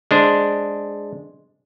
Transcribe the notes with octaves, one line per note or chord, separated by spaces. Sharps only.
G#3 D4 C5